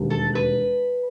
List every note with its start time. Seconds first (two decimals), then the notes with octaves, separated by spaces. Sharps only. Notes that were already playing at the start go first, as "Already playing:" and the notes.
Already playing: E1 D#2 D#3 G3
0.10 A4
0.35 B4